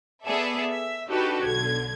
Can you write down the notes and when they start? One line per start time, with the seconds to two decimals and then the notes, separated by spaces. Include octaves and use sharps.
0.24 B3 G#4 A4 D5 E5
0.71 E5
1.08 D4 D#4 F#4 G4 A4 B4
1.44 B1 D3 G#6